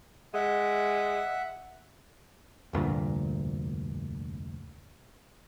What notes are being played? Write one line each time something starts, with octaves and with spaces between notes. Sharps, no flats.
G#3 E5 F#5
F1 D2 G2 A#2